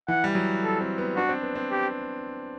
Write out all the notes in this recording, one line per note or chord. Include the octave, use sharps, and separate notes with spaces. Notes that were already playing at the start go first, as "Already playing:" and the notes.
E3 F#5
G3
F#3
A4
C4
B3
D4 F#4
C4
B3
C4
G4